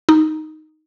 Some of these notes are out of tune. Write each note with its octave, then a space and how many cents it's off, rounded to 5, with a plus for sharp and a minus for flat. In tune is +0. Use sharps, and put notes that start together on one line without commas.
D#4 +0